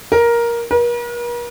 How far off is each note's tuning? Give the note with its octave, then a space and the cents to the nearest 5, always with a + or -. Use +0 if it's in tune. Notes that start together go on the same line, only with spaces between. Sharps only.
A#4 +10
A#4 +45